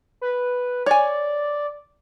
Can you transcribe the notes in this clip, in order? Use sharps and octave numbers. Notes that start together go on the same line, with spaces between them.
B4
C#5 D5 G#5